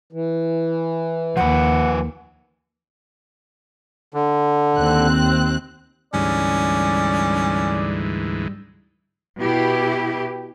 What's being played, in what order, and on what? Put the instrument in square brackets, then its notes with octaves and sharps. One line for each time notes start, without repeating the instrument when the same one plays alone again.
[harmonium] E3
[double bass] D#2 [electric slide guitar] F3 B4 [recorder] F#5
[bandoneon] D3
[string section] D#2 C4 F#6
[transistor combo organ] D2 G#2 E3 [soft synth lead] G3 [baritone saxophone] C#4 [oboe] D5
[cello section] B2 E4 G4 B4